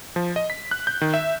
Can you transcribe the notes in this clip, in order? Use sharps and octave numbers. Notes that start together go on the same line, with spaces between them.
F3
D#5
B6
F#6
G6
D#3
E5